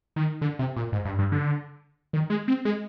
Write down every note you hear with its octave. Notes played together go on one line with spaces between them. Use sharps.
D#3
D3
C3
A#2
G#2
G2
G2
D3
D#3
G#3
C4
G#3